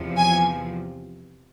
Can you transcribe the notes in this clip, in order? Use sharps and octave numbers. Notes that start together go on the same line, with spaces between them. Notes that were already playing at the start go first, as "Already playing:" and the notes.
Already playing: E2 C3 F3
G#5